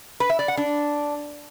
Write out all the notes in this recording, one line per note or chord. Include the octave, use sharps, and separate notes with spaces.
B4
E5
D5
F#5
D4